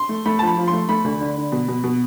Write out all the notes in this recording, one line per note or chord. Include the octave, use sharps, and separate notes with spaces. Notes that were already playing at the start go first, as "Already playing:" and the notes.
Already playing: C6
A3
A3 B5
A5
F3
B5
F3
A3 C6
A3 B5
D2
D3
D3
B2
B2
B2